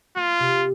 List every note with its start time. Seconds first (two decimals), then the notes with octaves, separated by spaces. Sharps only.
0.16 A#3 F4
0.40 C3